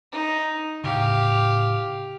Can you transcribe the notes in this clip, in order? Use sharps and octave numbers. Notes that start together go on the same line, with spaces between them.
D#4
A2 C#3 G4 F5